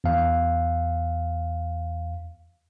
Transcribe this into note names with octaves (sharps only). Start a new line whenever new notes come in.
E2 F5